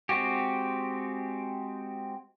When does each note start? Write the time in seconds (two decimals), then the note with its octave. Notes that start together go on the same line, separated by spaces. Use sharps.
0.09 G#3 C4 F#4 G4